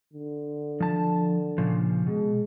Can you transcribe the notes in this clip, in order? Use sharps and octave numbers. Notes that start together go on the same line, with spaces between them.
D3
F3 A5
A#2 C#3 F3
B2 G#3